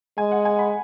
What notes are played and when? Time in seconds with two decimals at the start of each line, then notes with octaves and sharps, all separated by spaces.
0.18 G#3 G#5
0.32 F#5
0.45 G#5
0.59 B5